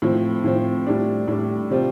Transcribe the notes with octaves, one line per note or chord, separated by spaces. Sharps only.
A2 F3 C4
A2 F3 C4
A2 G3 D4
A2 G3 D4
C3 G3 C4 F4